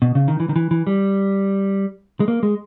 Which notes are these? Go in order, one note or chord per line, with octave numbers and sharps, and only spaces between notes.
B2
C#3
D#3
E3
D#3
E3
E3
G3
G#3
A#3
G#3